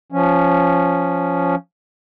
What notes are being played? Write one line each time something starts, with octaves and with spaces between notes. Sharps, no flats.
F3 C#4